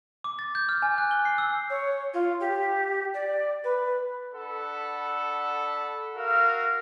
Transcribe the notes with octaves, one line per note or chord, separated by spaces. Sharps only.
D6
A6
G6
F6
G#5
F#6
G7
C7
E6
C#5
F4
G4
D5
B4
D4 A4 F#5 B5
F#4 A#4 E5 F5